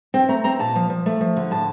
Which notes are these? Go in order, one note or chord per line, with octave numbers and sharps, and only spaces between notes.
C4 G5
A3 A#5
C4 A#5
A#2 A5
F3
F3
A3
F3
D3
A2 A5